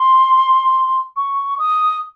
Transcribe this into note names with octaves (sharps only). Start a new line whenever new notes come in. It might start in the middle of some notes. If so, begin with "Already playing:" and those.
Already playing: C6
C#6
D#6